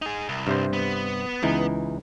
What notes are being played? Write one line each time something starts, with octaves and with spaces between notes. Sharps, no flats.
D#4 G#4
C2
G2 C3 C5
B3
C#2 E3 D#4